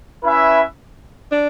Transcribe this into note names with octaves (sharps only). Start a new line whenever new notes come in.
C#4 E4 B4 E5
D4